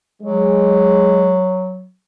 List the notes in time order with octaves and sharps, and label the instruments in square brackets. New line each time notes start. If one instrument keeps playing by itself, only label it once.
[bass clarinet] F#3 [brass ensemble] G#3